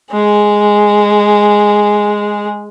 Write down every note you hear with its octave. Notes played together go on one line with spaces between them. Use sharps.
G#3 G#4